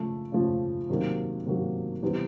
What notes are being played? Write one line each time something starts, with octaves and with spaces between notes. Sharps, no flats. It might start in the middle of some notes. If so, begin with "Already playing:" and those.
Already playing: C#3 F3 A3
C#3 F3 A3
C3 D#3 F#3 A#3
C3 D#3 F#3 A#3
C3 E3 G3 B3